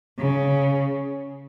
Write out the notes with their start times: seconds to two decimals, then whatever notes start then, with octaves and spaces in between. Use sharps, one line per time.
0.19 C#3